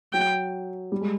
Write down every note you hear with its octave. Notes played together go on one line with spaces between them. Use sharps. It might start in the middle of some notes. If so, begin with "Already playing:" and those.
F#3 G5
G3
G#3